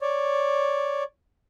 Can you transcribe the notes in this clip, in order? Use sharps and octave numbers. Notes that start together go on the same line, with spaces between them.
C#5 D5